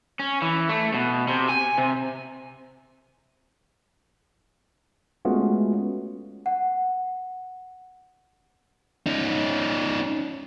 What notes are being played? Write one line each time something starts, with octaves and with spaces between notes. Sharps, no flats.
C#4
E3
A3
B2
C3
G#5
C3
G#3 A3 B3 C#4 F4 F#4
F#5
C#4 D#4